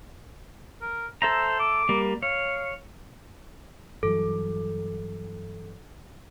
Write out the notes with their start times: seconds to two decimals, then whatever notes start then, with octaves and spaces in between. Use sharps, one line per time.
0.82 A#4
1.22 A4 C5 E5 A#5
1.59 D6
1.89 G3 A#3
2.23 C#5 F5
4.03 G2 E3 F#3 A4